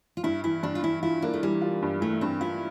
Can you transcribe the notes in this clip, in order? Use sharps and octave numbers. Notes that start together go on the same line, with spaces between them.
F4
G2 E4
E3 E4
G2 D4
F4
E3 E4
E4 F4
A#3 D4
A3
E3 G3
F4
G2
E3 A3
G2 C4
E4 F4